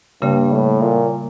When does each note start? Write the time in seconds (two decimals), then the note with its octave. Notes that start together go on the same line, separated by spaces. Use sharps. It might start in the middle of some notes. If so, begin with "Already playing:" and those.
0.22 G2 C#3 G3 A#3
0.52 A2
0.82 A#2